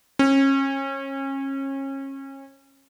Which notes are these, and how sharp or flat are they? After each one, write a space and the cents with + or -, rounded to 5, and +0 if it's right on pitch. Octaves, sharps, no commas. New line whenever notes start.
C#4 -30